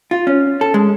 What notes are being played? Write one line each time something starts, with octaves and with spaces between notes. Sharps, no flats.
F4
C#4
A4
G#3